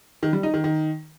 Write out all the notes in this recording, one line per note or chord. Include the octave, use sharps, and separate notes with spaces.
D#3
G3
D#4
D#3
D#3